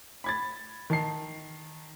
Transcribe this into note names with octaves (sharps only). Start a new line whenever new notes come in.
B5 G#6 A6
D#3 A5 C7